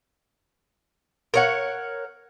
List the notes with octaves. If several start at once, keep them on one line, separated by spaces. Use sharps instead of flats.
A#4 C#5 F#5